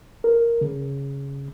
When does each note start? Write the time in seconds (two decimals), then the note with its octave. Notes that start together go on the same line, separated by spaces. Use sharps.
0.24 A#4
0.61 C#3